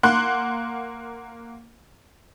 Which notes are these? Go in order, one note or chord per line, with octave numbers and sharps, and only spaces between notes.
A#3 F#5 C6 F#6